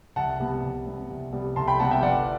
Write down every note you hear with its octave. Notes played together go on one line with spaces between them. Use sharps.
C2 F#5 A5
C3 G3 B3
C2
C3 G3 B3
C2
C3 G3 B3
C2 A5 C6
G5 B5
C3 G3 B3 F#5 A5
E5 G5
G1 D5 F#5